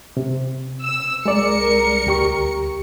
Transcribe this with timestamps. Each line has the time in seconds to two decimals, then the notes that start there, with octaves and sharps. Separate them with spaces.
0.17 C3
0.81 E6
1.26 C2 G#3 G#4 A#4 D5 C#7
2.07 D2 G4 C#6